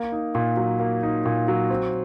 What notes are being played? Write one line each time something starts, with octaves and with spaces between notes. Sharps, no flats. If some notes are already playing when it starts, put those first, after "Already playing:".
Already playing: A#3
D#4
A#2
F#3
A#3
D#4
A#2
F#3
C4